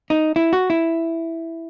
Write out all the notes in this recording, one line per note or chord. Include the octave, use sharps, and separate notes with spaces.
D#4
E4
F#4
E4